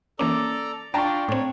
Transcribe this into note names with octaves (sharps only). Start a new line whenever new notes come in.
E3 A#3 C#4 A4 D5 A#5 D6
D4 F4 D5 G5 A5 A#5 C#6
A2 C4 C#5